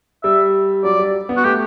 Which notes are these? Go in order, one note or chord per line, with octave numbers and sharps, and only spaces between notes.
G3 E5
F#3 D5
G3
B3
F#4
A3 G4